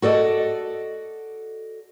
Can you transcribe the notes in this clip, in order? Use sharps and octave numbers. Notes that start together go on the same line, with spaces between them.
F#4 A4 D5 D#5